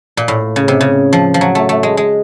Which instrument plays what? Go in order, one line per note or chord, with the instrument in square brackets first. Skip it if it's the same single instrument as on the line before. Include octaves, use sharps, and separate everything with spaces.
[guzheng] A#2
A2
C#3
C3
C#3
F3
F3
F#3
A3
A3
G#3
G#3